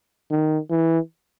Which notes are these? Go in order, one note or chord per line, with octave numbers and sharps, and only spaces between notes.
D#3
E3